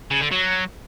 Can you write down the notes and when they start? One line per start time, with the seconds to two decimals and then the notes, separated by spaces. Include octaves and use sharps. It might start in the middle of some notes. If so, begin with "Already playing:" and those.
0.11 C#3
0.21 D3
0.32 F#3